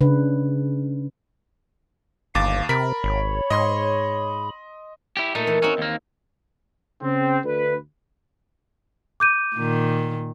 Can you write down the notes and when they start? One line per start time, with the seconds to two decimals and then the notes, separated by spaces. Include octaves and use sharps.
0.01 C#3 D4 B4
2.35 G1 D#2 F5 D6 A6
2.69 C3 A#4 B5 B6
3.04 G#1 C#5
3.50 G#2 D#5 C6
5.17 E4 G4
5.35 A#2 A3 D#4
5.47 E3
5.62 C4 C#4 D#4 F#4
5.78 D#2 A#3
7.02 C#3 C4
7.44 D2 B4
9.20 D6 G6 D#7
9.55 A#2 D#3